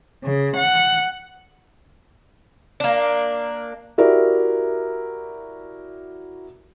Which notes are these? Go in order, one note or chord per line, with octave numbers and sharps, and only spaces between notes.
C#3
F#5
A#3 D4
E4 F#4 G4 A#4 D5 E5